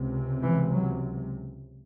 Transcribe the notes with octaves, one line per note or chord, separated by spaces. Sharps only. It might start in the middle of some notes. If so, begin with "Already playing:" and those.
Already playing: C#2 C3
E3
F#3